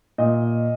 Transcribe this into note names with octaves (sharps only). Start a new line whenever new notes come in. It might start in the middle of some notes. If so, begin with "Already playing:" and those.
A#2 D#5